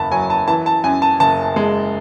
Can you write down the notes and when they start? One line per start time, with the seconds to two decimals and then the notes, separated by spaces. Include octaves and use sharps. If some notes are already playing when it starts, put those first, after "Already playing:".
Already playing: F#1 E2 A5 B5
0.11 F#3 G#5
0.30 A5
0.48 E3 A5
0.66 A5
0.84 F#2 G#5
1.02 A5
1.20 F#1 A5
1.56 G#3